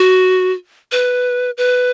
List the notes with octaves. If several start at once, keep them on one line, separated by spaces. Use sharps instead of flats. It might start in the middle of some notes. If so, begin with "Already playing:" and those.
Already playing: F#4
B4
B4